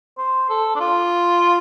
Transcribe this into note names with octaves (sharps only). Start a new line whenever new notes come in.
C5
A4
D4
F4